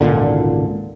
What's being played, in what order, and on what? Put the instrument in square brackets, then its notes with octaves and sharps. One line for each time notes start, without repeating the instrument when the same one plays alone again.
[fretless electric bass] G#1 C#2 A#2 D3